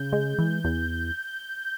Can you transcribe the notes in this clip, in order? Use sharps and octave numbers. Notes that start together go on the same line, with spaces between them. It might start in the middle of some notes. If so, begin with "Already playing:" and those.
Already playing: C#3 G6
G#3
E3
E2